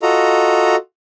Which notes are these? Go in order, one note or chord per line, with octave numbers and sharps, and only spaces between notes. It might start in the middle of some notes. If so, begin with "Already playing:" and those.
F4 F#4 A4 D#5 A#5